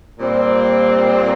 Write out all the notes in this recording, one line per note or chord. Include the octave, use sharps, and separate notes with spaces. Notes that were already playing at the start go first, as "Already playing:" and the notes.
A#2 G3 C4